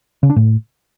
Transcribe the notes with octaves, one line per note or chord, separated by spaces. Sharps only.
C#3
D4
A2